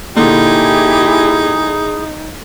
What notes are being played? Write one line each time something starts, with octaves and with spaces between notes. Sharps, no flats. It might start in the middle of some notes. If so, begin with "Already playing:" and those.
A#2 D3 D#4 E4 G4 G#4 D#6